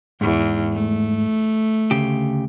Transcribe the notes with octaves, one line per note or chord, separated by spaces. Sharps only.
E2 G#2
A3
D2 C#3 G4